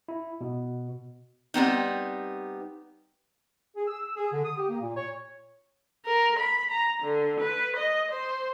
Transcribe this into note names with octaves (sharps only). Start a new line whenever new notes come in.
E4
B2
G3 B3 C4 D#4
G#4
E6
E6
G#4
D3
D#6
G4
A#3
A#2
C#5
A#4
B5
A#5
D3
B4
D#5
C5